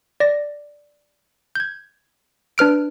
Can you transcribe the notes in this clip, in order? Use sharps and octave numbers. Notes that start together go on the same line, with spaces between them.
D5 A#6
G6 G#6
D4 B4 F6 D7